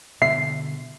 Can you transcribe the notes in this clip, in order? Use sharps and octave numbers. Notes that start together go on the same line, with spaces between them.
B2 D3 E5 C7